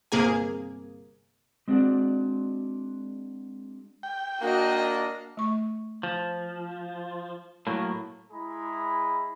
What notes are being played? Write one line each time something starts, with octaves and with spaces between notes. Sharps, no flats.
G1 C3 A#3 G#4 G#5
G#3 C4 D4 F#4 D5
G5
A#3 D4 F#4 D#5
A3 C#6
F3
A2 F#3 A#3
G#3 E4 G#4 A#5 B5